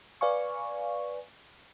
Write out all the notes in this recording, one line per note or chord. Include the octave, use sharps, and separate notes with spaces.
B4 D5 F5 G#5 C#6